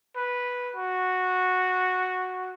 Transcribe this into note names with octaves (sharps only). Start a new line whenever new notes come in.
B4
F#4